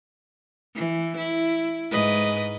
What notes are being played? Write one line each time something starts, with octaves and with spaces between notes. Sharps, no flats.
E3
E4
G#2 B4 D#5